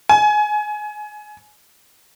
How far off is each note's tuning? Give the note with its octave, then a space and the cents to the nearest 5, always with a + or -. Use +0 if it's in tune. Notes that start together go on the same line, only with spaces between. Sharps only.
G#5 +20